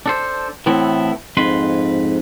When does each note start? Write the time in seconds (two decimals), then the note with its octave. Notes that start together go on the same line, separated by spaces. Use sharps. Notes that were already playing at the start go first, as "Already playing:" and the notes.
0.06 D4 A4 C5
0.66 A2 E3 B3 C4 E4 A4
1.37 F2 G#2 B4 C6